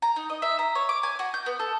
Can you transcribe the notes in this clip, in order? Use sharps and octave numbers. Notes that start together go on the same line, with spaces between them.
A#5
D#4
D#5
E5
A#5
C#5
D6
G#5
F#4
G6
B3
A4